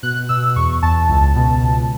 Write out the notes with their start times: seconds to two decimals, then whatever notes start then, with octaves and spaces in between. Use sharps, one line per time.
0.03 B2 F#6
0.29 B2 E6
0.56 E2 C#6
0.83 E2 A5
1.09 C#2
1.36 B2
1.62 C#2